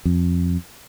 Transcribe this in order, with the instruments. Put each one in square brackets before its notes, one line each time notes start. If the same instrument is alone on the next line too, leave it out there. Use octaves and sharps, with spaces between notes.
[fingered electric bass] F2